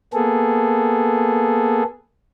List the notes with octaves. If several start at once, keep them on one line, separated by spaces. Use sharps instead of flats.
A#3 B3 G#4 A4